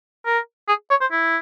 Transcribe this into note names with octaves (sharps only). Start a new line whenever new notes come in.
A#4
G#4
C#5
C5
E4